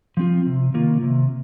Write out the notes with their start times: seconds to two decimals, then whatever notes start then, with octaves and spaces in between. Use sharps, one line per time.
0.17 F3 C4 F4
0.46 C3
0.74 D#3 A#3 F4
1.03 C3